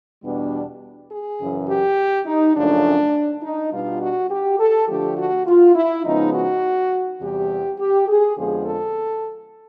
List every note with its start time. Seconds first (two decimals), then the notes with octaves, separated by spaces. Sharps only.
0.22 E2 B2 G3 B3 D4
1.10 G#4
1.39 F#2 C#3 E3
1.68 G4
2.26 D#4
2.55 F#2 C#3 F3 A3 C#4 D4
3.43 D#4
3.71 B2 G3 B3 D4 F4
4.01 F#4
4.30 G4
4.59 A4
4.87 D3 F3 A3 D4 G4
5.17 F#4
5.46 F4
5.75 E4
6.05 C#3 F3 G#3 B3 D#4
6.33 F#4
7.20 E2 C3 E3 G3 G4
7.79 G4
8.08 G#4
8.37 F2 D3 F3 G#3 B3 G#4
8.66 A4